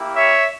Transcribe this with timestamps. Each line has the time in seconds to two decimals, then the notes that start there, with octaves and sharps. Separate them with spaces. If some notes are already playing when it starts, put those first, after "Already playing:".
Already playing: A#3 E4 G4
0.15 C#5 E5